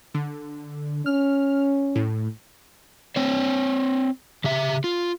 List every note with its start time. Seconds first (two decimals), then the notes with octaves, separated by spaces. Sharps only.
0.14 D3
1.06 C#4 F6
1.96 A2
3.16 C4 C5 C#5
4.44 C#3 G4 E5
4.84 F4